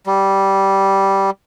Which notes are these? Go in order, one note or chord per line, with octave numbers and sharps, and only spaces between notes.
G3